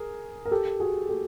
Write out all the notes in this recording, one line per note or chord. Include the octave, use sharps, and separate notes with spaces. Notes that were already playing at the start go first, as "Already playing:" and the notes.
Already playing: G#4 A#4
A#4
G4 A4
F#4 G#4
G4 A4